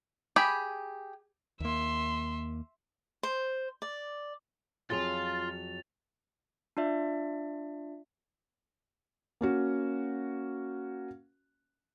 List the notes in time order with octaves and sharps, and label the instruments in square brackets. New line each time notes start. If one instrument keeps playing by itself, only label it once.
[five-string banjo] G4 G#4 B5
[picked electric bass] D#2 A#3 [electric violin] E5 C6
[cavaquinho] C5
D5
[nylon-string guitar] F2 F#3 G#4 [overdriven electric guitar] F4 [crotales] A6 F7
[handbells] D4 F4 D5 E5
[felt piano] A#3 C#4 F#4